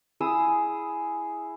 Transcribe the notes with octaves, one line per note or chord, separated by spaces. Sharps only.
E4 G#4 D#6 E6